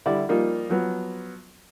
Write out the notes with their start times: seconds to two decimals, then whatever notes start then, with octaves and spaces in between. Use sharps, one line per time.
0.06 D3 G3 E4 D5
0.29 F3 G3 A#3 D#4 F4
0.69 F3 F#3 B3